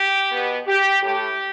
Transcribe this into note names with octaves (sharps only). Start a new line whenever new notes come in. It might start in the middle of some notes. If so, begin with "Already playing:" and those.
Already playing: G4
B2 B3
G4
A2 A3 G4